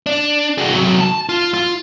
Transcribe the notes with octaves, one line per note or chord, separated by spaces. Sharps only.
D4
F#4 G#4
C3 F#3
A5
F4
F4